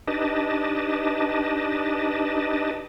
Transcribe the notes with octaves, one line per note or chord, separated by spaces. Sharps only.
D4 D#4 G4 B4 D#5 A5